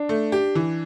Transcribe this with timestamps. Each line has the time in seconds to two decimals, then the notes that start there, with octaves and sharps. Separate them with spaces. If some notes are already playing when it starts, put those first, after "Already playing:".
Already playing: D4
0.09 A3
0.32 G4
0.55 E3